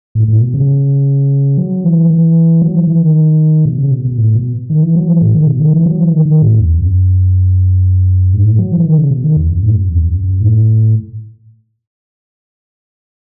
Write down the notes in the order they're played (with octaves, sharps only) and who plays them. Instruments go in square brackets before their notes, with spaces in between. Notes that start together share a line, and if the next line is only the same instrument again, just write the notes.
[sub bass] A2
A2
B2
C#3
F#3
E3
E3
F#3
E3
E3
D#3
B2
C#3
B2
B2
A2
B2
D#3
E3
F#3
E3
A2
D#3
B2
D#3
E3
F#3
E3
D#3
D#3
A2
E2
F#2
G#2
A2
F#3
E3
D#3
C#3
B2
D#3
E2
F#2
A2
F#2
E2
F#2
F#2
A2